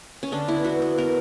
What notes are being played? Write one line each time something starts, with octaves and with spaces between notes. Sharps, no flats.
C#4
D3 D4
B3 E4
B3 F#4
B3
B3 A#4